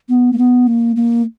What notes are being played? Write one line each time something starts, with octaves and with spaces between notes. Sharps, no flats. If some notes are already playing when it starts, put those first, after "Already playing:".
B3
A#3
B3
A#3
A#3